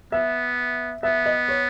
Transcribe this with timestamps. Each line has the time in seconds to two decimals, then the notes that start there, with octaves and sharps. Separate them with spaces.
0.12 B3 E5
1.03 B3 E5
1.26 D#5
1.48 C#5